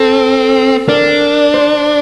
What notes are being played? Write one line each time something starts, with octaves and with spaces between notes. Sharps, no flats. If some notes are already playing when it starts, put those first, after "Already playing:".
Already playing: C4 A4
D4 A#4
C5